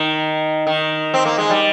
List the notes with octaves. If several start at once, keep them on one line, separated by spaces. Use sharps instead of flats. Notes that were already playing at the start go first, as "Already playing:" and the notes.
Already playing: D#3
D#3
C4
A#3
G#3
G3